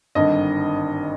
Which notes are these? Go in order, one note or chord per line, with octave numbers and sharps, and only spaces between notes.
G#1 G2 D3 D#5